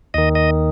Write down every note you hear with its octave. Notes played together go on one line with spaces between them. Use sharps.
D#2 D#3 D#5
D#5